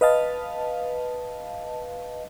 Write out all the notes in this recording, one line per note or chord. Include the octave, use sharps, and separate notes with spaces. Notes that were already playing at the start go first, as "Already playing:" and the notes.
B4 D#5 F5 A5